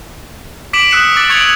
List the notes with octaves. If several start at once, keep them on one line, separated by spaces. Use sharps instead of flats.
D6 B6 D7 E7 F#7
D#6 E6 F#6 C#7 E7
D6 A6
C#6 G#6 C#7 D7 F7 F#7